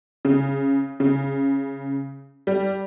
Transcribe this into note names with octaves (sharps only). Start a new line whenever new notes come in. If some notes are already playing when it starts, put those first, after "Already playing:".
C#3
C#3
G3